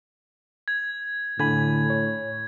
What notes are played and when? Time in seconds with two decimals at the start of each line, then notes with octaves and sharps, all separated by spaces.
0.68 G#6
1.39 A2 D3 G#5 B5 G#6
1.90 C#5